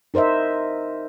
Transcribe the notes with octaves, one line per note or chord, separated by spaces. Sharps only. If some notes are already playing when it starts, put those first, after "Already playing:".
D#4 A#4 C5 D#5 E5